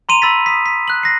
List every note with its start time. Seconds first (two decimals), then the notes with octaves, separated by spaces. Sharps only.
0.09 A#5 C6 D#7 F7
0.22 B5 E6 A6 B6
0.46 D#6 B6
0.66 B6
0.88 F#6 F#7
1.03 A#6 C7